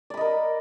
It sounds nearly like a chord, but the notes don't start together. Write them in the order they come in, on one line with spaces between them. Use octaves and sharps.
D5 B5 D#5 A#4